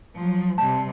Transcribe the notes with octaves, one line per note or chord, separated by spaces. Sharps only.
F3 F#3
C3 G3 A5